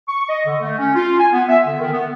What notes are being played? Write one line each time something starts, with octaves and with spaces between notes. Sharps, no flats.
C#6
D#5
D3
A3
C#4
F4
G#5
B3
E5
D3
D#3
B3